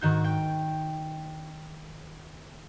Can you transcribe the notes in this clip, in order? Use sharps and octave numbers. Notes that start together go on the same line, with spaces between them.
G#2 D#3 F#4 G6
G5